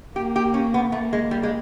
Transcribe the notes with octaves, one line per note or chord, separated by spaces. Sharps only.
A#3 G4
G4
C#4
B3
A3 A#3
G#3
G3
G#3